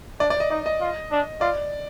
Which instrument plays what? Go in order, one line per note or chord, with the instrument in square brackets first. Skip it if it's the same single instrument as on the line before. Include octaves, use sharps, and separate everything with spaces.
[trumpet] D4 [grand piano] D5
[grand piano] D5
D#5
[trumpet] D#4 [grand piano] D5
[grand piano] D#5
[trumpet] F4
D4
[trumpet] F4 [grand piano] D5